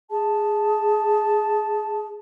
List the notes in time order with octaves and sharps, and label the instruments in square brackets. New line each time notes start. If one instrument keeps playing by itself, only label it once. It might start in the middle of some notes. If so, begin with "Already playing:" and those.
[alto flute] G#4 [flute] A5